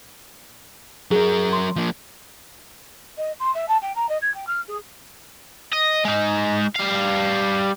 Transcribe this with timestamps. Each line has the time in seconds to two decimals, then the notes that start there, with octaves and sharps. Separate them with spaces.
1.11 F#3 G#4 A#4
1.53 C6
1.76 F3 A#3
3.17 D#5
3.40 C6
3.54 E5
3.68 A5
3.82 G5
3.96 A#5
4.09 D#5
4.22 G#6
4.34 G5
4.47 F6
4.68 G#4
5.73 D#5
6.05 G#3 D#4
6.76 G3 F5